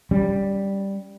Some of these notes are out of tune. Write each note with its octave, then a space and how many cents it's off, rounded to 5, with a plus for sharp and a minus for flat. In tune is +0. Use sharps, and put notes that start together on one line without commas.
G3 +0 C#4 +30